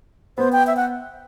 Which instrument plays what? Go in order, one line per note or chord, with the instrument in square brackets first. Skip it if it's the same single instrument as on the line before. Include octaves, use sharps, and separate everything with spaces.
[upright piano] B3 [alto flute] C5
[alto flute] G5
E5
F#5